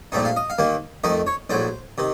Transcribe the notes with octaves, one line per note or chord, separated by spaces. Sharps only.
A#1 A#2 A3 C4 D#4
F5
D#5
F5
D#2 D#3 A#3
F2 D#3 A3 D#4 D#5
C#5
A#1 A2 F#3 C5
C3 D#3